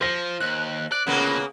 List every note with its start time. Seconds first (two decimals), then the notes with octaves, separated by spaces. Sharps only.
0.01 F3 C5 A#6
0.40 D#2 F#6
0.92 D5 F#6
1.07 D2 A#2 C#3 A#3 B3